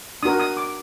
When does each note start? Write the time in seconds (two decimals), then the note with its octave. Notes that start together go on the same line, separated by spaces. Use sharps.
0.23 D4 F#4 A#4 D#6
0.39 D#6
0.57 D6